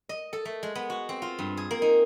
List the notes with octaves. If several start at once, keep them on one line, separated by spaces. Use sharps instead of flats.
D#5
A4
A3
G#3
B3
F#4
C4
F4
G2
G#4
A#3
D#4